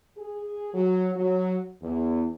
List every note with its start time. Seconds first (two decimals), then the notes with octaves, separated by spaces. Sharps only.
0.17 G#4
0.73 F#3
1.15 F#3
1.81 E2